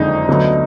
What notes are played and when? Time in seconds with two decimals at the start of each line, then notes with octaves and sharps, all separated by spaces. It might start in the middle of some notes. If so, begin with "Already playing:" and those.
Already playing: F#1 F2 D3 G#3 D#4
0.28 D2 D3 F#3 B3